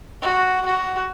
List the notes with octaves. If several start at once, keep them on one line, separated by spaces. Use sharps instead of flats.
F#4
F#4